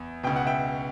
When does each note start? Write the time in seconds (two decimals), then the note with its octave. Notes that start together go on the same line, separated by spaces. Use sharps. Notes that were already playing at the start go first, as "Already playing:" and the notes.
Already playing: E2
0.23 C#2 B2 G5
0.36 F#5
0.47 E5 G5